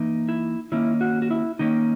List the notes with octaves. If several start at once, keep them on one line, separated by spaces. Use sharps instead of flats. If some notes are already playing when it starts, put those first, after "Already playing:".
Already playing: E3 A#3 D#4
E4
D#3 A#3 C#4 E4
F#4
F#4
E4
D#3 A#3 C#4 D#4